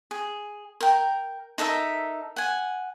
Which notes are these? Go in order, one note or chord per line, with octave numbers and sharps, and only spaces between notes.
G#4
A#4 G5
D#4 A4 A#4 E5
F#5 G#5